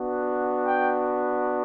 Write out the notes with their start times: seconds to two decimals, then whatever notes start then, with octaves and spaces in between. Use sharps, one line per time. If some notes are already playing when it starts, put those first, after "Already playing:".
Already playing: B3 D4 F#4
0.66 G5